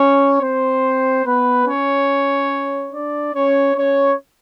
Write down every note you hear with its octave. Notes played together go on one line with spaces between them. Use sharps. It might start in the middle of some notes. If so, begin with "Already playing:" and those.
Already playing: C#4 C#5
C4 C5
B3 B4
C#4 C#5
D4 D5
C#4 C#5
C#4 C#5